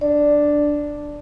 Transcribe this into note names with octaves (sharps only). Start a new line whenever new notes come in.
D4 D5